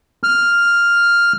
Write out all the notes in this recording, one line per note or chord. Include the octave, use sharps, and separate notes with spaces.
F6